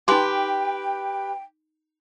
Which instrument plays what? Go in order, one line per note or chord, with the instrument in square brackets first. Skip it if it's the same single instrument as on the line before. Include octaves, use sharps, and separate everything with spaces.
[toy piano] D#4 G#5 C6 [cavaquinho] G4 B4 [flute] G5